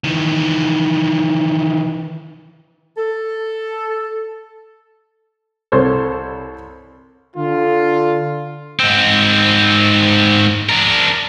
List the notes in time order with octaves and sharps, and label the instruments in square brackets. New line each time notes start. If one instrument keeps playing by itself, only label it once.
[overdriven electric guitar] D#3 E3
[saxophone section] A4
[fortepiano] C2 A4 C5 C#5
[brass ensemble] D3 F4
[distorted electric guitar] G#2 C4
D4 A#4